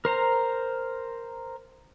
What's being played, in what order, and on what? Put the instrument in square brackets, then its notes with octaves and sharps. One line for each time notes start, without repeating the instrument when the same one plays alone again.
[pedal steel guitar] A#4 C5 A#5